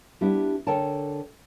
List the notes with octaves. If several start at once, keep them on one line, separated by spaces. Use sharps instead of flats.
G3 B3 D4 E4 G4
D3 A4 A#4 C#5 G5 A5